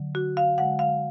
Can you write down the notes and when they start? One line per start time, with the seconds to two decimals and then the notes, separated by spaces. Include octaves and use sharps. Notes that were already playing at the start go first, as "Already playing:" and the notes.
Already playing: D3 F#3
0.15 F#4
0.37 F5
0.58 D3 G#3 F#5
0.79 F5